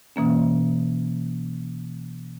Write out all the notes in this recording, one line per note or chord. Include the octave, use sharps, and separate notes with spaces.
B2 E3 A#3 C#4